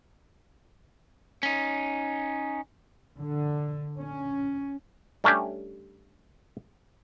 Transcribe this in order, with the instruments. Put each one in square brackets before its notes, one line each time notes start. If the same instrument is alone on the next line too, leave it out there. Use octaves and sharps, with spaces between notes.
[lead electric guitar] C#4 D#4
[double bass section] D3
C#4
[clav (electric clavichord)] G3 A3 C#4 D4 G4